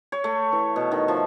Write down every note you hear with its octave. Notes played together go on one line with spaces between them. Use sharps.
C#5
A3
E3
B2
D#3
F3